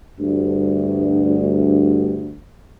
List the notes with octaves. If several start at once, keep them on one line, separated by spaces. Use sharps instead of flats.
D2 G2